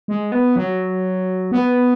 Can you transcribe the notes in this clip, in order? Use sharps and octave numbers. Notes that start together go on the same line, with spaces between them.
G#3
B3
F#3
B3